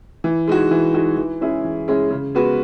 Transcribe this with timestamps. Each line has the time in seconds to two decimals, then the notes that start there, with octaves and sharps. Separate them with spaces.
0.24 E3
0.47 G#3 D#4 F#4
0.71 E3
0.94 G#3 D#4 F#4
1.17 E3
1.41 G#3 C#4 E4 G#4
1.64 E3
1.88 G#3 C#4 E4 G#4
2.11 C#3
2.35 G#3 B3 F#4 B4